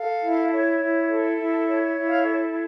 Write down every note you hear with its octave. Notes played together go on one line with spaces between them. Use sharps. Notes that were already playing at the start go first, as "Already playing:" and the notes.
Already playing: A4 F5
E4
C#5
E4
A4
E4
C#5
E4
F5
A4